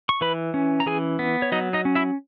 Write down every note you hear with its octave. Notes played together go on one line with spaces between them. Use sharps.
C#6
E3 B4 B5
C#4
A#5
E3 G#4 G#5
B3
C#5
F#3 D#4 D#5
D#4 D#5
C#4
E4 E5